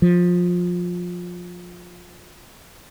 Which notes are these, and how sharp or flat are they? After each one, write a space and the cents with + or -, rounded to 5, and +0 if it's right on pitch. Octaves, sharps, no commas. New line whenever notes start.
F3 +20